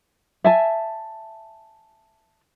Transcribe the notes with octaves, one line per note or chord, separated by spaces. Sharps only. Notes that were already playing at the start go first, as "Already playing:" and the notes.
E5 G#5 A5